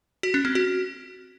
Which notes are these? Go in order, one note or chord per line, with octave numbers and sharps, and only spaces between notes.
F#4
C#4
C4
F#4